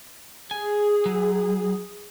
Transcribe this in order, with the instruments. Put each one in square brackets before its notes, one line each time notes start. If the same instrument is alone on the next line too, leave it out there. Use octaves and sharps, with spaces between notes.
[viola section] G#4 [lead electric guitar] G#5
[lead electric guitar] F#3